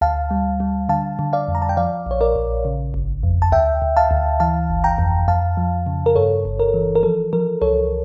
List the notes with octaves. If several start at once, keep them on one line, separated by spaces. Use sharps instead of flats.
D2 F5 A5
G3
G3
D3 F5 A5
D3
D5 F5
F2
A#5
A5
G5
F3 D5 F5
A#1 C#5
A#4 D5
A#1
C#3
G1
F2
A5
D2 E5 G5
D2
F5 A5
D2
E3 F5 A5
G1
G5 A#5
F2
F2 F5 A5
F3
C#3
A#4
G2 A4 C#5
G1
A#4
E3
A#4
F3 A4
F3 A#4
C#2 A4 C#5